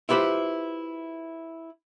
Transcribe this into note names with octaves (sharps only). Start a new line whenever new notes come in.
E4 F4 G4 B4 C5